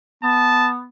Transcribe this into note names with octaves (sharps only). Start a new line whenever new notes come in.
B3 A5